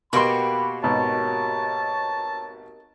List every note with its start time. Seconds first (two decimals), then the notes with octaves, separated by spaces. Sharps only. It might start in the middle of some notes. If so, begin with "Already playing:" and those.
0.13 B2 A#3 F#4 G4 B5 C6
0.84 G#1 B2 C#5 A5